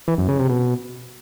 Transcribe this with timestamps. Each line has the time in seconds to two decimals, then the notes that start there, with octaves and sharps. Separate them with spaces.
0.08 E3
0.18 F#2
0.29 C#3
0.39 C3
0.49 B2